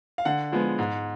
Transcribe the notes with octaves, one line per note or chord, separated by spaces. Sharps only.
F5
D3 F#5
F3 G#3 B3
G#2